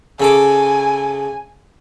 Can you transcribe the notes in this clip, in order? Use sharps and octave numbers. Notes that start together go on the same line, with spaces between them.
C#3 A4 G#5 D6